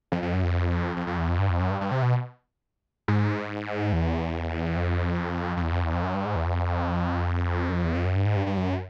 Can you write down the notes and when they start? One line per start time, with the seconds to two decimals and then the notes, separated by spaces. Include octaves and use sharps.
0.12 F2
0.22 F2
0.33 F#2
0.43 F2
0.96 F2
1.07 F2
1.18 E2
1.29 F2
1.39 G2
1.49 F2
1.60 F#2
1.70 G2
1.81 G2
1.92 C3
2.02 B2
3.08 G#2
3.93 E2
4.77 F2
5.57 F2
5.62 E2
5.72 F2
5.83 E2
5.93 F2
6.03 F#2
6.14 G2
6.25 G#2
6.36 E2
6.46 F2
7.69 F#2
7.72 F2
7.84 E2
7.95 F2
8.05 F#2
8.16 G2
8.25 G#2
8.36 G2
8.46 G2
8.57 F#2